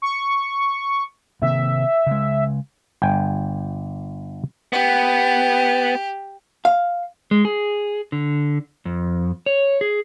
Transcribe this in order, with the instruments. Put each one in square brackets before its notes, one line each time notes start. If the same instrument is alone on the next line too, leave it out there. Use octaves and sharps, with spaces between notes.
[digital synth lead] C#6
[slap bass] C3 D#3 A#3 [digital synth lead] E5
[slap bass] C#3 G#3
[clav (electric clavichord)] G1 G5 G#5
[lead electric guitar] B3 [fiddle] G4
[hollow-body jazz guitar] F5
[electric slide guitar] G#3
G#4
D3
F2
C#5
G#4